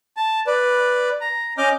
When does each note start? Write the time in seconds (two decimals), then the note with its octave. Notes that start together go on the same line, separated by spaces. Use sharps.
0.17 A5
0.47 B4 D5
1.21 A#5
1.58 C#4 D#5 D6 F6 G6